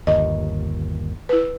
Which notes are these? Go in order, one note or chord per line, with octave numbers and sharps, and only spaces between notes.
G1 D#2 D#5
E4 B4